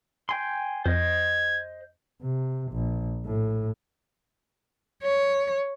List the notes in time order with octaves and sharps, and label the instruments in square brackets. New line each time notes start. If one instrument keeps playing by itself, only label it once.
[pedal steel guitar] G5 G#5 C6
[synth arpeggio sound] F2 [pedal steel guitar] C5 D#5 [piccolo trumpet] G#6
[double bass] C3
A#1
A2
[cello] C#5